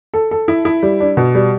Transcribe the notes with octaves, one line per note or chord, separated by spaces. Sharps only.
A4
A4
E4
E4
G3
D4
B2
G3